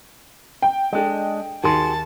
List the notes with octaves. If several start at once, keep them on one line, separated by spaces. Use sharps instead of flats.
G5
G#3 D4 A4 D#5
D#2 F#4 G#4 A5 C6